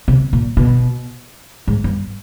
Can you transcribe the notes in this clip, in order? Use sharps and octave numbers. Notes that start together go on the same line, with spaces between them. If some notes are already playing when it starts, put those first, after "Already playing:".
C3
A#2
B2
G#2
G2